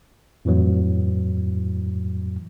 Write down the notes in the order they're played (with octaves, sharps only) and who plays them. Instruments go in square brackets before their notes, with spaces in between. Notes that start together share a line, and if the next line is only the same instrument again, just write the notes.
[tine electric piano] F2 A2 E3 F#3